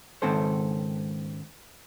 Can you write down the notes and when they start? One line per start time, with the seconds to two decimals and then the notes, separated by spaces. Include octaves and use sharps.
0.22 C#2 G#2 D#3 C4 A4 C5